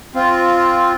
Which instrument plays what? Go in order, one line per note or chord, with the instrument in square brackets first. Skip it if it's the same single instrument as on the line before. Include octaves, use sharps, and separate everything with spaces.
[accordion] C4 F4